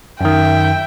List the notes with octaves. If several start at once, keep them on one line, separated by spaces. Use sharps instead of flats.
F#2 D#3 E5 G5